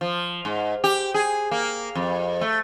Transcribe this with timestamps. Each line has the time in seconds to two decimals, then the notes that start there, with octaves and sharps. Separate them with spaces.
0.01 F3
0.45 G#2
0.84 G4
1.14 G#4
1.51 A#3
1.95 F2
2.41 A3